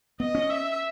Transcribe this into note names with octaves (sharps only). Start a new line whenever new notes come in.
B3 D#5
C#4
E5